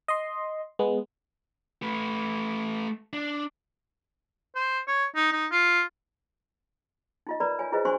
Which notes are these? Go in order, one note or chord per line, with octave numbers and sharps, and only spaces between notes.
D#5 C6
G#3 B3
A3 B4
D4
C5
C#5
D#4
D#4
F4
D#4 F4 D#5
A#4 B4 D5 A#5 B5
F4 C#5 G#5
E4 F4 G#4 B4 C5 D#5
D4 F#4 C5 G#5 C6 C#6